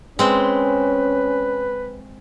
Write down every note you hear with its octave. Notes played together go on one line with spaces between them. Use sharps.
G#3 C4 C#4 B4 C5